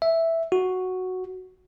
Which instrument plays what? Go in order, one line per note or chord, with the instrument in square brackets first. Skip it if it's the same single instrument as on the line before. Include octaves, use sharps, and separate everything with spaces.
[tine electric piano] E5
F#4